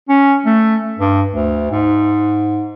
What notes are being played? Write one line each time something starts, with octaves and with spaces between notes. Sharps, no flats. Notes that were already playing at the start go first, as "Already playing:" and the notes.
C#4
A3
G2
D2
G#2